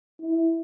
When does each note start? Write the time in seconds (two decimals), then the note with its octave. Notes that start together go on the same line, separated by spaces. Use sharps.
0.20 E4